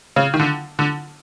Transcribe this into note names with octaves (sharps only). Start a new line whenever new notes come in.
C#3
D#3
D3
D3